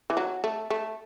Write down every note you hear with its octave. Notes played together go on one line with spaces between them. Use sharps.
E3
F#3
A3
A3